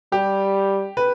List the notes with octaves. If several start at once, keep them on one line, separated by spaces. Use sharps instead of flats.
G3 G4
B4